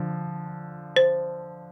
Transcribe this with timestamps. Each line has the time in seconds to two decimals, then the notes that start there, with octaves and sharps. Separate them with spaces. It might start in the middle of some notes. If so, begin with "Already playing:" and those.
Already playing: D3 F3
0.96 C5